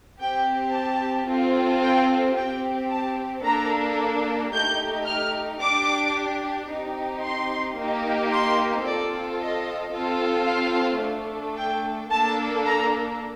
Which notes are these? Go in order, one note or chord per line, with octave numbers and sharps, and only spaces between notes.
C4 G4 G5
A5
C4 F4 A4
G5
C4 G4 G5
A5
A#3 D4 A4 A#5
A3 D#4 G4 G6
F6
D4 G4 D6
C4 D#4 G4
C6
A#3 D#4 G4
C6
C4 F4 A4 D5
D#5
C4 F4 A4
F5
A3 D4 A4
G5
A#3 D4 A4 A5
A#5